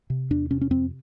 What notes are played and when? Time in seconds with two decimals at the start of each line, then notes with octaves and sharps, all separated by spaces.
0.10 C3
0.30 E2 D4
0.51 C3 C#4
0.61 C#4
0.70 F2 C4